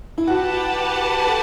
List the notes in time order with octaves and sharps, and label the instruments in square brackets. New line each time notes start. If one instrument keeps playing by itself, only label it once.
[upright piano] E4
[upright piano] F#4 [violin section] G4 B4 F#5 A5
[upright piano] A4